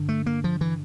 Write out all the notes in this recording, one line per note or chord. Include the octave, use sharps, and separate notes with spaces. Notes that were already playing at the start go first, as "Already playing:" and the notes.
Already playing: G2 D3
A3
A#3
F3
E3